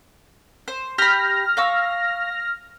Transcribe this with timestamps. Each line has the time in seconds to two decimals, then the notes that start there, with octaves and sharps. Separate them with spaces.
0.68 C5
0.98 G4 B5 F6 A#6
1.57 F5 C#6 E6